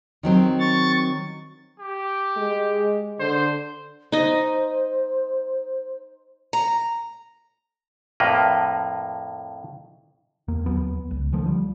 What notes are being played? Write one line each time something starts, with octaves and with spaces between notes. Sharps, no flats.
D#3 F#3 C4
C#6 A6
G4
G#3
D3 C5
D#4 C5 D#5
A#5
F2 A2 A#3 B4
E2 A#3
D#2 F#3 B3
C#2
D3 D#3 F3 A3
F3 G3